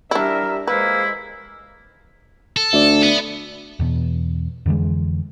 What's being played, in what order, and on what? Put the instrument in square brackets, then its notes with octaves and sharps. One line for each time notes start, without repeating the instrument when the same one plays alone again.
[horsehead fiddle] G3 E5 [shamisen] D4 E4 [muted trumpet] A#4
[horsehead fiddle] G#3 C5 [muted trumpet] A#3 [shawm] E4 [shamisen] B4
[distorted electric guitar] A4
[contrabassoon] D2 [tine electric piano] D5 E5
[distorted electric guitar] B3
[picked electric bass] E2 B2
F2 D3 E3 G#3